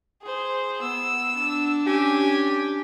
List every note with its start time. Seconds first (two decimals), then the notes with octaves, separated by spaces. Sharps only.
0.22 G#4 C5
0.81 B3 E6
1.38 D4
1.87 C#4 G4 G#5